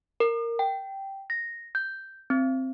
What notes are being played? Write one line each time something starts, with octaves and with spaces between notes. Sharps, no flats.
A#4
G5
A#6
G6
C4